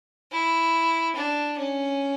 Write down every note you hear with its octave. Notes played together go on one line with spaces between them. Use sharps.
E4
D4
C#4